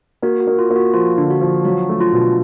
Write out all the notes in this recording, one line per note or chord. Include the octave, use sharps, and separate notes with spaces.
A#3 F#4
F#4
A#3
F4
A#3
F#4
F3 F4
D3
F#4
F3
F#3 F#4
A3
F4
B2